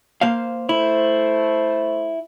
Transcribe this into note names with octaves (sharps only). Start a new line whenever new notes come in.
A#3 C5 F5
A3 E4 C5